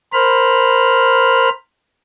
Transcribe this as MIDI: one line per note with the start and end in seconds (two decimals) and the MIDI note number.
0.13 1.49 70
0.13 1.49 72
0.13 1.49 83
0.13 1.49 89